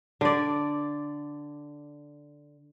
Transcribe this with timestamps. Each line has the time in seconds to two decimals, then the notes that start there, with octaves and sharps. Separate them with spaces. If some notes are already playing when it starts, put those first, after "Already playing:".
0.21 D3 D5